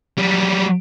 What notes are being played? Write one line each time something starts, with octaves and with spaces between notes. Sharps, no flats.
F#3 G3